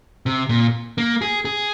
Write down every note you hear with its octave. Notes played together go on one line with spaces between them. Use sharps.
C3
A#2
A#3
G#4
G#4